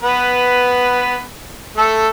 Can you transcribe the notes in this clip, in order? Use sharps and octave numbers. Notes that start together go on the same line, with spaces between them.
B3 B4
A3 A4